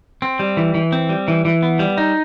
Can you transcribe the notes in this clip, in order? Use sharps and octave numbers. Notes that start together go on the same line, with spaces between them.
C4
G3
E3
E3
C4
G3
E3
E3
B3
G3
D#4